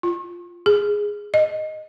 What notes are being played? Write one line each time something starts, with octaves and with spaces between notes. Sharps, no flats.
F4
G#4
D#5